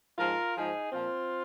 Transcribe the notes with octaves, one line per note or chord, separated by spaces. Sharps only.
G#2 F3 F4 A#4
G#2 F3 D#4 G#4
A#2 F3 C4 F4